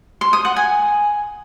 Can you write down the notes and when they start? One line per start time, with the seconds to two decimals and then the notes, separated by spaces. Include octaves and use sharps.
0.21 C6
0.33 D#6
0.45 F#5
0.56 G#5